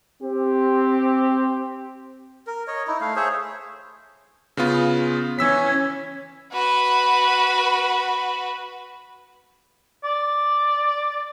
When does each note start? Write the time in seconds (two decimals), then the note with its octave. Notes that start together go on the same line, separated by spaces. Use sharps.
0.21 C4 G4
2.47 A#4
2.68 C#5 D#5
2.87 D#4 E4
3.01 A3 F5
3.16 G#4 C5 C#5 E5
4.57 C#3 B3 F4
5.39 E3 C#4 E6 B6
6.52 F#4 B4
10.04 D5